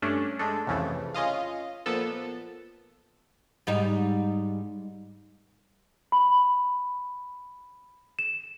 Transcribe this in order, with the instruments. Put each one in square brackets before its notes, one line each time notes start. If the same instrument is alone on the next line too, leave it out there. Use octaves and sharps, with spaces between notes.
[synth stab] G2 A3 C#4 D4
G#3 A3 D4 A4
C2 F2 C#3 E3 A3
C#4 F4 D#5 F5
A#2 F3 B3 A4
[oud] G#2 G3 D#4
[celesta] B5
E7